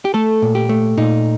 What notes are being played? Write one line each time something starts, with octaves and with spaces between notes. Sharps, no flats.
G4
A3 A4
A#2
G4
A3
A#2 D#4